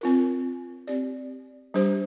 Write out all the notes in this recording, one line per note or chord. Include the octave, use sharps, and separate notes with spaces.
C4 F4 A#4
C4 G4 D5
G3 D4 G4 C5